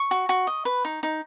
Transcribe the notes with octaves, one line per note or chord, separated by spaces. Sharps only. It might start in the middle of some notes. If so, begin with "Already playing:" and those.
Already playing: C#6
F#4
F#4
D#5
B4
D#4
D#4